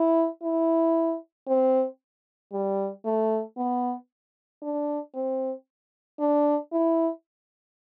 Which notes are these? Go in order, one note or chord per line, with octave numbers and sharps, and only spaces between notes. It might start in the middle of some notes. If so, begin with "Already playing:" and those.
Already playing: E4
E4
C4
G3
A3
B3
D4
C4
D4
E4